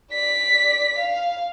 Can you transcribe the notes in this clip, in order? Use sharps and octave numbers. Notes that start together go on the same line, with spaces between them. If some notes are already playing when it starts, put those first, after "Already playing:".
D5 B6
F5